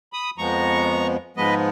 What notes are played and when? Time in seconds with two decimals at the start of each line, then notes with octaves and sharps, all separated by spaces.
0.13 B5 D#6
0.38 F2 F3 G#3 B3 A#5 C#6
1.37 G#2 F3 G#3 B3 B4 D#5